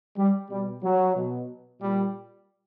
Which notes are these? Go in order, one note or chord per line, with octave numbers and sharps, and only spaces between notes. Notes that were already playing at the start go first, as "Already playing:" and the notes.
G3
B2 G3
F#3
B2
A#2 G3